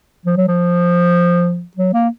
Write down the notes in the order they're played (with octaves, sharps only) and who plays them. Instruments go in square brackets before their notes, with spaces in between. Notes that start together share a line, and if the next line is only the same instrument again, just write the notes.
[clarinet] F3
F#3
F3
F#3
A#3